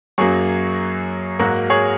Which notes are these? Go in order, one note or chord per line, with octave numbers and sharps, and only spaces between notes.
F#2 F#3 A#3 G#4 C#5
G#2 F#3 A#3 F#4 A#4
G#4 C#5